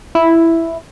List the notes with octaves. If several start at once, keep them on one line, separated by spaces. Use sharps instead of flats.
E4